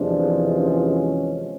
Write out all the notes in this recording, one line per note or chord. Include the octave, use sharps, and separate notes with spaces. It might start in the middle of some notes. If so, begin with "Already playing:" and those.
Already playing: E2 C3 F3 G#3 D4
C#4